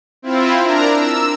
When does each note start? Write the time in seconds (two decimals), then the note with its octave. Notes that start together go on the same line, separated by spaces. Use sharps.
0.22 C4 E4 F4
0.62 D4 A#4 A#5
0.93 E6